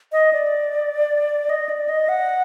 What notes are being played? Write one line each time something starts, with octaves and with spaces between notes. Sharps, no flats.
D#5
D5
D#5
D5
D#5
F#5